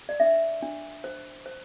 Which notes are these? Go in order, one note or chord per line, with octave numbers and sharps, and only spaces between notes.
D5
D4 E5
D4
C5
C5